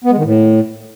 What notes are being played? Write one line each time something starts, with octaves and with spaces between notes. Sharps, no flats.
B3
G#3
D#3
A2